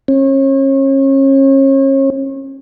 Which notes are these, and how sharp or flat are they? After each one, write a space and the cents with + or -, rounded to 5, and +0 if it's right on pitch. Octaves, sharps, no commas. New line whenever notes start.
C#4 -35